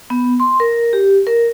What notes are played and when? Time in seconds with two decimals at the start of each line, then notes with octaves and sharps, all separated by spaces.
0.10 B3
0.40 C6
0.60 A#4
0.93 G4
1.27 A#4